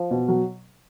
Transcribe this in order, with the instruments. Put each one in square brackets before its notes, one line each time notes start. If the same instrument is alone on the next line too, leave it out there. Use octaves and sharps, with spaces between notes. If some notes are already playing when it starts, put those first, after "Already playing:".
Already playing: [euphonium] F3
[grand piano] B2
F#3